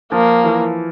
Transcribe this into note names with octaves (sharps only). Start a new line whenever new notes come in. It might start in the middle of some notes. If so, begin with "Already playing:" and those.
F3 A#3
E3